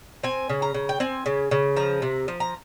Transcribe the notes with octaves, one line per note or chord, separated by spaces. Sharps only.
C4 G#5
C#3
A#5
C#3
G5
C4 G#5
C#3
C#3
F3 A#5
C3
F3
A#5